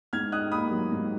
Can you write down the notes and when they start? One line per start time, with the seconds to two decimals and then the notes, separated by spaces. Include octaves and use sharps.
0.13 G#2 F6 G#6
0.32 D#4 D#6 F#6
0.52 A#3 B5 D#6
0.72 F#3
0.92 G#2